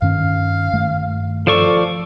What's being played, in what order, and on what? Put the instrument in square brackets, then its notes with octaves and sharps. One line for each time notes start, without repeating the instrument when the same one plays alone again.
[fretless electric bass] G2 D#3 C#4 [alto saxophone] F5
[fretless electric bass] G2 D#3 A3
[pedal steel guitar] F3 D5 C#6 [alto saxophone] A4